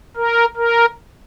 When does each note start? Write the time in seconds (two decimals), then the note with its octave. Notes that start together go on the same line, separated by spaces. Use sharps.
0.17 A#4
0.57 A#4